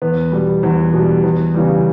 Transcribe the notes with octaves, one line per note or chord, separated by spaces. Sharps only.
E2 B3
B2 G3
E2
B2 G3
E2
C#3 E3 G3